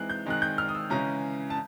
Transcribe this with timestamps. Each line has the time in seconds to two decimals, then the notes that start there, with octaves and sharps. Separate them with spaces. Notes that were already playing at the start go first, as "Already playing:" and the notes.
Already playing: E3 G#3 C4 D#4 F#6
0.10 G6
0.26 D#3 G#3 C4 D#4 F#6
0.42 G6
0.58 F6
0.69 D#6
0.75 E6
0.90 C#3 E3 G#3 C#4 A#5
1.50 A5